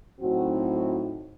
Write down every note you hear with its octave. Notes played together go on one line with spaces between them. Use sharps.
A2 F#3 C4 D#4 F#4